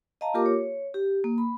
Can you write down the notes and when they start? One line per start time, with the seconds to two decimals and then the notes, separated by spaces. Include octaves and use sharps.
0.21 D#5 F5 A5 A#5
0.34 A#3 F4 G4 A#4 D6
0.46 C#5
0.94 G4
1.24 A#3
1.38 B5